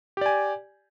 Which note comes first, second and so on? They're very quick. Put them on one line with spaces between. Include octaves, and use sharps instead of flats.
G4 D5 G#5